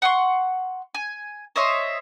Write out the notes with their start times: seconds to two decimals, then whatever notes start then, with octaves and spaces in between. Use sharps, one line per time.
0.02 F#5 C6 C#6
0.95 G#5
1.56 C5 C#5 D#5 E5